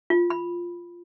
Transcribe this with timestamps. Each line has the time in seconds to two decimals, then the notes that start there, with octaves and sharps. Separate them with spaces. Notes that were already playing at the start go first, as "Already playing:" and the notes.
0.10 F4
0.30 B5